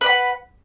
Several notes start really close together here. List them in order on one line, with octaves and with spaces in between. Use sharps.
B4 D5 B5 F#5